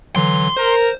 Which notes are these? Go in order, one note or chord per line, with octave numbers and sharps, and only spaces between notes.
D3 E3 F#3 C6
A#4 C5